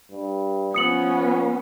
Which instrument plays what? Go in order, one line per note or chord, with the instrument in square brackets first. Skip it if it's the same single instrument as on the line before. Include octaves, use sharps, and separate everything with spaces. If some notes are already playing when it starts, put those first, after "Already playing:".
[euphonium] G2
[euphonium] F3 [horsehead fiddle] B3 C#4 [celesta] D#6 C#7 F#7